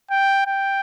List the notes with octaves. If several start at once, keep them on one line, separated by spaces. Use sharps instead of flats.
G5
G5